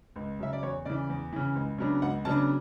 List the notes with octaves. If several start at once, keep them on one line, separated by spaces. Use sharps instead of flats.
C#2
C#3 F#3 E5
D5
E2 C#5
C#3 E3 D5
E2
C#3 E3
C#2
C#3 F#3 B3 D4
C#2 F#5
C#3 F#3 B3 D4 A5